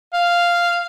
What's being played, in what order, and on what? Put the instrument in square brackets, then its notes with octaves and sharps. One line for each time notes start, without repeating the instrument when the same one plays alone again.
[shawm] F5